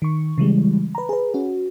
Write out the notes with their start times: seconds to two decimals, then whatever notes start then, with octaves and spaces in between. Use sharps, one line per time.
0.02 D#3 C#6
0.38 C#3 E3 G3 G#3
0.95 B4 A#5
1.09 G#4 B4
1.34 C#4 F#4